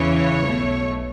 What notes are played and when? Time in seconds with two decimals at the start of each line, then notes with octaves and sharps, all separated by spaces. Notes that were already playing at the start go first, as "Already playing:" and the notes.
Already playing: E2 C#3 E3 C#5
0.44 B1 B2 A3